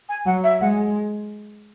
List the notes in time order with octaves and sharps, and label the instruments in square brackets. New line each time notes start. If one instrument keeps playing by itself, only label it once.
[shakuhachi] G#5
[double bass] F#3 [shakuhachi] F#5
[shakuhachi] E5
[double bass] G#3 [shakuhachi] F#5